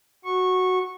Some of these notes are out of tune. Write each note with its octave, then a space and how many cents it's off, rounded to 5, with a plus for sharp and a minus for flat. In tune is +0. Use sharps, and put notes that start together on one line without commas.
F#4 +0 C#6 -15